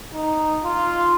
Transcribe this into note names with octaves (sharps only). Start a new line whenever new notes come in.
D#4
F4